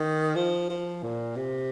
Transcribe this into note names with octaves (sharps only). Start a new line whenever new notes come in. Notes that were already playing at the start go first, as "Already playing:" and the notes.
Already playing: D#3
F3
F3
A#2
C3